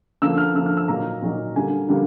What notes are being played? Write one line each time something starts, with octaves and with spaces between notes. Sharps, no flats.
D3 F3 A#3 E6
F6
D3 F3 A#3 E6
F6
E6
A#2 F#3 A#3 D#4 A#5
A#2 F#3 A#3 D#4
D3 G3 A#3 G#5
D3 G3 A#3